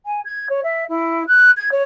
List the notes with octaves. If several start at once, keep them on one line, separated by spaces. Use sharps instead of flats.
G#5
G#6
C#5
E5
E4
F#6
G#6
C#5